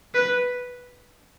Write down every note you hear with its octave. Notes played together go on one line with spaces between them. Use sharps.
B4